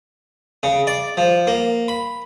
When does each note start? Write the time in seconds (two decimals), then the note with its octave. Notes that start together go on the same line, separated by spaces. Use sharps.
0.63 C#3
0.87 D5
1.17 F3
1.47 A#3
1.88 B5